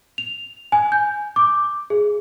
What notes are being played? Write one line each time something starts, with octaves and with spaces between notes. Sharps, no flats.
F7
G#5
G6
D6
G#4